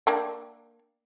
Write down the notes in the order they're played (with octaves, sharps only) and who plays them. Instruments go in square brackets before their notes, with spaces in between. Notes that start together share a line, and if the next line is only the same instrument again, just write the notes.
[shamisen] A#3 D4 G5